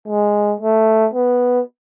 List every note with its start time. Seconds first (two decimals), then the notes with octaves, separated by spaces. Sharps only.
0.08 G#3
0.61 A3
1.14 B3